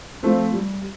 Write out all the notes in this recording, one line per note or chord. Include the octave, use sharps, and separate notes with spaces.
F3 A3 C4
G3